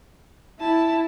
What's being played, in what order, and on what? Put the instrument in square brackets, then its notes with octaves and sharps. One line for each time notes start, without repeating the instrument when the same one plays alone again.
[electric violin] E4 [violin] A5